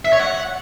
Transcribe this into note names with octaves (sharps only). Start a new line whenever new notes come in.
E5
C#5
F#5